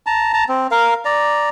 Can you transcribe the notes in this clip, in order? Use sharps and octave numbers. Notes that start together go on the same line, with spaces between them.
A5 A#5
A5 A#5
C4
A#4 F5
D5 A#5